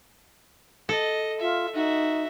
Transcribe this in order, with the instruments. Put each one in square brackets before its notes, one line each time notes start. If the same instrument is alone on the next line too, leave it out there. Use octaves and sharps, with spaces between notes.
[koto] A4 [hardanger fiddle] D#5
[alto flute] F4 [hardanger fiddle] E5
[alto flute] D#4 [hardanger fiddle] F#4 E5